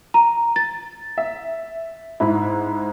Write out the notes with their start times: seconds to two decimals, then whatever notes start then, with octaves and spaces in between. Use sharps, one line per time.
0.14 A#5
0.56 A6
1.18 E5
2.20 G#2 E4